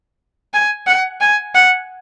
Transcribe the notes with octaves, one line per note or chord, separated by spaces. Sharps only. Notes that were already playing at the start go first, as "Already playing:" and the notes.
G#5
F#5
G#5
F#5